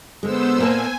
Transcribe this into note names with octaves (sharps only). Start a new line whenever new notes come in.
D3 G#3 B3 C5 E6
A#2 A#3 G#5 A5